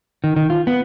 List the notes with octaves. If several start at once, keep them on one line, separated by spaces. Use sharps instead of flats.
D#3
D#3
F4
B3